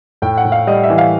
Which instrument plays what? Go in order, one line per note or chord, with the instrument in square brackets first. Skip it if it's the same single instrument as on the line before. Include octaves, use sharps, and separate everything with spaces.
[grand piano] A2 G5
F#5
A2
F5
G3 D#5
E5
E3
F5